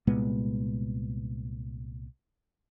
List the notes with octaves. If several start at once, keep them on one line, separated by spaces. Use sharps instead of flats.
C2 A#2 G#3 B3